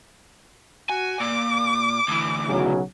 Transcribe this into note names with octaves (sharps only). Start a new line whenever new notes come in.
F#4 G#5
A#2 D6
D2 E3
B1 C#3 F#3